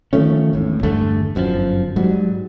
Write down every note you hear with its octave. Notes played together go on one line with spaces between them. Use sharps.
D#3 F3 A3 C#4
G#1 E2 A2
E2 G2 D3 A3
G1 F#2 D3 F3
G#2 F#3 G3